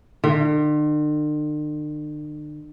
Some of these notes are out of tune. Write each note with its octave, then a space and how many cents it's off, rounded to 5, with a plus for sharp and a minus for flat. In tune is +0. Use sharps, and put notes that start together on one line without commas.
D3 +45